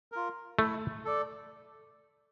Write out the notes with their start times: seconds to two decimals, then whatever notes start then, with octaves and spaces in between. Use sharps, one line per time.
0.12 F4 A#4
0.59 A3 E4
1.05 A4 D5